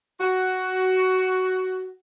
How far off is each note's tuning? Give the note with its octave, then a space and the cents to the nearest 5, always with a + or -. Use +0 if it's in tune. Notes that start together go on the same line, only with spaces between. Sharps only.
F#4 +10